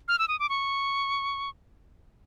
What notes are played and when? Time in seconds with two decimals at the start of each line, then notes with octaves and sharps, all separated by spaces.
0.08 F6
0.19 E6
0.28 D#6
0.39 D6
0.49 C#6